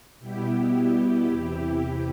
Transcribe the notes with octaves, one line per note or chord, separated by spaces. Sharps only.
B2 G3 B3 E4 G4
E2 C3 E3
E4